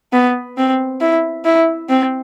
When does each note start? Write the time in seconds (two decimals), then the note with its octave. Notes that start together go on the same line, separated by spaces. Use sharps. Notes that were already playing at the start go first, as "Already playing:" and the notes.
0.13 B3
0.58 C4
1.01 E4
1.45 E4
1.90 C4